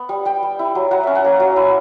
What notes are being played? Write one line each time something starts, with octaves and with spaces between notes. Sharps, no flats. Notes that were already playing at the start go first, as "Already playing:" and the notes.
Already playing: B3
G3
G3 G5
G3
E4
F#3
F#3 F#5
C#4 E5
F#5
A#3
F#3
E4